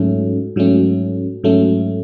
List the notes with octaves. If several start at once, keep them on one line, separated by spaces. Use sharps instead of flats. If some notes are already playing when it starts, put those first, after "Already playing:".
Already playing: G#2 F#3 A3 C#4
G#2 F#3 A3 C#4
G#2 F#3 A3 C#4